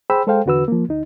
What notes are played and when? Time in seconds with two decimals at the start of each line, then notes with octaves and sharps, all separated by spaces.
0.10 G#4 C5 G5 B5 E6
0.27 G#3 A4 C5 F5 G5
0.46 E2 D3 F#4 B4 E6
0.68 F3 A#3
0.89 D2 D#4